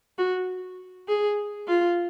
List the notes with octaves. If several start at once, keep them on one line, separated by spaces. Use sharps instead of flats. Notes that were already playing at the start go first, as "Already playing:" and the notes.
F#4
G#4
F4